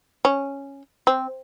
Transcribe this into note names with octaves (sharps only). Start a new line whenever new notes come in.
C#4
C4